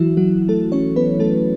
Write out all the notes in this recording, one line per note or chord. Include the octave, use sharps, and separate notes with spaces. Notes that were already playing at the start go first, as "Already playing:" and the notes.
Already playing: E3 F#3 E4 F#4
F#3 F#4
A3 A4
C#4 C#5
B3 B4
A3 A4